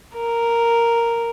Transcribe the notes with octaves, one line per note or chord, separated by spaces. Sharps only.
A#4